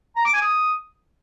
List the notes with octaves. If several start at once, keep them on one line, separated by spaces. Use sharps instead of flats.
A#5
D6
G#5
D#6